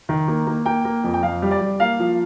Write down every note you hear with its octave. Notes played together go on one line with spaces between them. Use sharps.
D#3
A#3
A#3
A#3 G5
A#3
F2
G5
F2 F5
G3
D5
G3
A#3 F5
F3